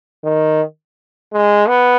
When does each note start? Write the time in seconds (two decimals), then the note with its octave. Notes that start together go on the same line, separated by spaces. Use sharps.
0.24 D#3
1.33 G#3
1.68 B3